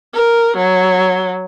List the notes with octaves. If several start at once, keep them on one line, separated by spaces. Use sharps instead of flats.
A#4
F#3